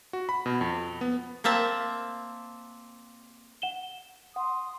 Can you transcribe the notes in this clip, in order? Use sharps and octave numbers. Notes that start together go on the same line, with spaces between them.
F#4
B5
B2
F2
B3
A#3 C4 E5 A5
F#5 E7 G7
F#5 C6 D#6